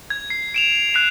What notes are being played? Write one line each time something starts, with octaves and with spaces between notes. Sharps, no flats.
G#6
C7
D7 E7 F7
F#6 C7 F7